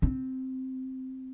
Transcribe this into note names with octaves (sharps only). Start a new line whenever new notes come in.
C4